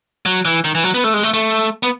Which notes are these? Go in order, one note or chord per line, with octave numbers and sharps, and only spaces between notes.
F#3
E3
D#3
E3
F#3
B3
A3
G#3
A3
A3
B3